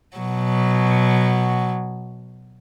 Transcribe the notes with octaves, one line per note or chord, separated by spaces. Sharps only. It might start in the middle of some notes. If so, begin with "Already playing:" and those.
B2 F#3